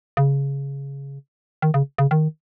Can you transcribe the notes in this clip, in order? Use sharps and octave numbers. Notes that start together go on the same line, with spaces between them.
C#3
D#3
C#3
C#3
D#3